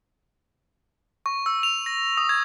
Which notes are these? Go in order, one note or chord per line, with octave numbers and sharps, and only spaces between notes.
C#6
E6
F7
A#6
D#6
G#6